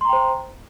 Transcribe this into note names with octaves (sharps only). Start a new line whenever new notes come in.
C5 G5 A#5 C6